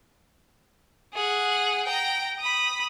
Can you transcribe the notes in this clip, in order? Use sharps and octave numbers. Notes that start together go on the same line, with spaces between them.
G#4 F#5
G5 A#5
B5 D#6